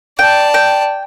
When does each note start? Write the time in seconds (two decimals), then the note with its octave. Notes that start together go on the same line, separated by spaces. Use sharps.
0.19 D5 G5 A5
0.54 G5